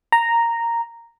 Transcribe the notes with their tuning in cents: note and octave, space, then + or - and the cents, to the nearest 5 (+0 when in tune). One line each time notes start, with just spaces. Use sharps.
A#5 -5